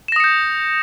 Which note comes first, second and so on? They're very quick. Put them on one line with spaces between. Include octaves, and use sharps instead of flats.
E7 A#6 D#6 C#7 G6